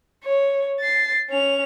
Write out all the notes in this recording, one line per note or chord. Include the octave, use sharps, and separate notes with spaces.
C#5
A6 C7
C#4 F7